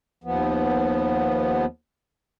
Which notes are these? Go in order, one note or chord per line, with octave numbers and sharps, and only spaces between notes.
D#2 F3 B3